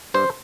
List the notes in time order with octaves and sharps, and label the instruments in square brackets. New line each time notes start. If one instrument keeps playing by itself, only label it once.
[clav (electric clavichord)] G2 C5